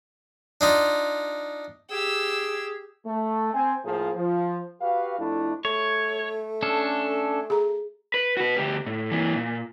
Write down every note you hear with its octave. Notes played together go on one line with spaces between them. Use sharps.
D4 D#4 F4
G4 G#4 E6
A3
C4 G#5
A2 F3 A#3 G#4 C5 F5
F3
F#4 G4 B4 F5
F2 A3 D4 E4
A3 C#5
C#4 D4 A4
G#4 A#5
B4
F#4 B4
D2 G4
A2
E3 A#3
A#2